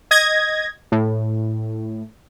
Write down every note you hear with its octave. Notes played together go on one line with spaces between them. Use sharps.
D#5 G#6 A#6
A2